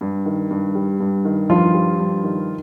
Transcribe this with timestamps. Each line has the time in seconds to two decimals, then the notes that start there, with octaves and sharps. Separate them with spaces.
0.01 G2
0.26 D#3
0.51 G2
0.75 G3
1.00 G2
1.25 D#3
1.49 G2 F3 F4
1.74 G3
1.99 G2
2.24 D#3